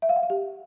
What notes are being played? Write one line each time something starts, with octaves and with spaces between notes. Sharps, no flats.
E5
F5
F#5
F5
G4